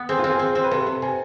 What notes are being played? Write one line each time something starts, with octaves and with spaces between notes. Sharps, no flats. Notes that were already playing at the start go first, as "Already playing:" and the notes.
Already playing: B3
C4 G#4
F4
C4
G#4
C4
C4
B4
C3 A4
C3
C3 G#5